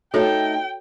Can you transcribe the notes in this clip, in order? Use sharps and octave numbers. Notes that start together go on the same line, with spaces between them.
A3 D#4 F#4 A4 C#5 G5